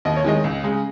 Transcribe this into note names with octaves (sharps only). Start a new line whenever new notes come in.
D#2 D#5
C#5
D#3 G#3 D#5
C#2
C#3 G#3